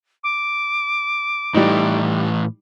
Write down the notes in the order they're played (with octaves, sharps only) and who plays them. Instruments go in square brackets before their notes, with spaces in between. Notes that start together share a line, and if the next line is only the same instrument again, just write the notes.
[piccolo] D6
[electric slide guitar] A2 E3 [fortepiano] G3 D#4